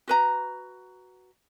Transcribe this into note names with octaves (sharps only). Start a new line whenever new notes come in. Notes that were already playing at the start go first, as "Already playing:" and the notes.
F#4 B4 A#5